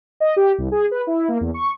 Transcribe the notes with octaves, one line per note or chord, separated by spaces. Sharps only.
D#5
G4
C2
G#4
B4
E4
A#3
E2
C#6